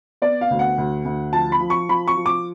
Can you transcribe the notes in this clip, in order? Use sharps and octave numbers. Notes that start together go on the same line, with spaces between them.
B3 D5
F5
D2
F#5
D2
D2
F3 A5
B5
F3
C#6
F3 B5
C#6
F3
D6